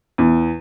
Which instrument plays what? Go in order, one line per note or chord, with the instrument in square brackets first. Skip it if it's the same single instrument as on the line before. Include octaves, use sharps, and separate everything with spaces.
[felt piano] E2